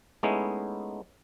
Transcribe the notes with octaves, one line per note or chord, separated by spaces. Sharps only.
G#3 A3 B3 C#4 D#4 E4